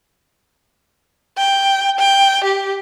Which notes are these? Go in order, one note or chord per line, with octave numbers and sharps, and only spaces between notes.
G5
G5
G4